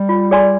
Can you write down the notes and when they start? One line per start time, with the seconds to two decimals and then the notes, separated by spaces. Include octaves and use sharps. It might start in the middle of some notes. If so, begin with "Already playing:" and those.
Already playing: G3
0.09 F4
0.31 G#4 D5 G#5 C6